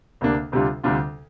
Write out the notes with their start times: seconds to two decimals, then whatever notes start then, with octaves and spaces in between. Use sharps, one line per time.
0.21 D2 C3 A#3 D4
0.52 D2 C3 G3 D4 F4
0.83 D2 C3 G3 D4 F4